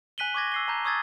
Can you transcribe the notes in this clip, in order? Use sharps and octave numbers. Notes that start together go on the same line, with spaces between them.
G#5 F#6 B6 D#7 F#7 G7
C#6 D6 G#6 A#6
E6 C7 G7
A5 A#5 G6
C#6 D#6 E6 G#6 A6